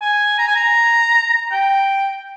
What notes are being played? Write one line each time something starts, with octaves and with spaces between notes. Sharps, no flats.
G#5
A#5
G#5
A#5
G5